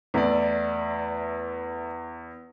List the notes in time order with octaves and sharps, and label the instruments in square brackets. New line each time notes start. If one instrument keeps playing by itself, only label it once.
[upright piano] E2 [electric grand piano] A3 E4 D5